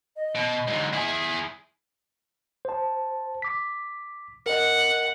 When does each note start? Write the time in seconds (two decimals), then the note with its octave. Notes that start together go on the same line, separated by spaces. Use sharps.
0.16 D#5
0.35 B2
0.68 G#2 D3
0.93 E4 G#4
2.65 C5 A5
3.42 D6 B6
4.46 A#4 D#5 F#5